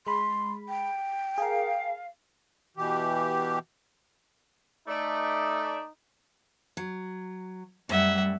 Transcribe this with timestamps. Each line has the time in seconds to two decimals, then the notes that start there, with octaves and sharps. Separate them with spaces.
0.07 G#3 B5 C6
0.68 G5
1.38 G#4 A#4 F5
2.77 B2 E3 G4
4.88 A3 D#4 D5
6.77 F#3
7.89 F#2 A2 G3 E5 F#5